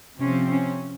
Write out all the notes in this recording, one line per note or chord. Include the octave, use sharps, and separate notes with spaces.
C3 F3 C4 C#4
C#4